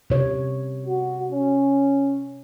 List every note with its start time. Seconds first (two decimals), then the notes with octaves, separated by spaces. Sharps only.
0.10 C3 C#5
0.86 F#4
1.32 C#4